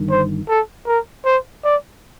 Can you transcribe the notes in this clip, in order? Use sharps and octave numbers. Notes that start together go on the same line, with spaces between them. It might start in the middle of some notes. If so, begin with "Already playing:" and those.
Already playing: G1 G2 D#3
C5
A4
A#4
C5
D5